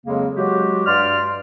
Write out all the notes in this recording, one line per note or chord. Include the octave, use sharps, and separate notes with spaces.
F2 C#3 F#3 G#3 A#3
F#3 G#3 F#4 G4
G2 D5 C6 F6